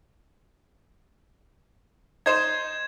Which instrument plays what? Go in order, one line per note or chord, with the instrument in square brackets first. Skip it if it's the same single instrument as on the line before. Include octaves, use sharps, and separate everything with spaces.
[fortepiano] D#4 C5 [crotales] G#6 E7